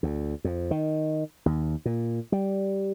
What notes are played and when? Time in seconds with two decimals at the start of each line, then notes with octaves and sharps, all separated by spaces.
0.03 D2
0.44 F2
0.71 D#3
1.46 D#2
1.86 A#2
2.32 G3